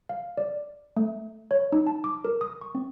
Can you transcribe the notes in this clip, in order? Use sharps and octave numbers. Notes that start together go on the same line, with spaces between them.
F5
D5
A3
C#5
D#4
A5
D6
A#4
D#6
C#6
C4